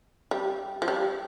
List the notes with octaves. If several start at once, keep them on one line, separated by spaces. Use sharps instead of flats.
G3
F3
G3